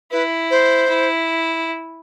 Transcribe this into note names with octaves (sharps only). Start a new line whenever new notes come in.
E4 B4
C5
E4